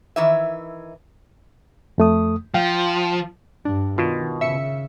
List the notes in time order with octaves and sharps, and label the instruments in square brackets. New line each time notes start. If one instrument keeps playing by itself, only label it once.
[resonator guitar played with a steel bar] D#3 E3 E5
[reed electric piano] F2 A3 D#6
[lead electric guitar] F3 [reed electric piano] F5 G5
[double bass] G2 [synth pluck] D4
[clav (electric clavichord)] B2 [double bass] D#3 [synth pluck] F4
[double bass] C#3 [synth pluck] E5 C#7